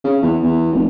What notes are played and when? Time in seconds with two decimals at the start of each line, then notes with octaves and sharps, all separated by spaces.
0.05 C#3
0.22 E2
0.42 E2
0.72 F1